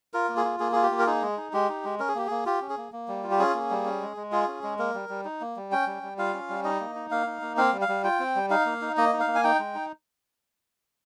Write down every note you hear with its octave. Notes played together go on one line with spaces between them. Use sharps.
F4 A#4
A#3
G#4
F4
A#3 G#4
F4 G#4
G4
A#3
A#4
D#4 G#4
G#3
D#4
G#3 G4
D#4
G#3
C#4 A#4
G#4
A#3 G4
A#3 G#4
F4 G4
C#4
G#4
A#3
A#3
G3
F4
G4
C#4 G#4
A#3
G3
C#4
G#3
G#3
F4 G#4
C#4
G#3
A#3 A#4
G3
G3
D#4
A#3
G3
C#4 G5
G3
G3
F4 F5
C#4
G3
D#4 D#5
A#3
D#4
A#3 F5
D#4
A#3
C4 F5
G3
F5
G3
F4 G5
C4
G3
D#4 F5
A#3
D#4
A#3 D#5
D#4
F5
A#3
G#5
D#4 G5
G#3
D#4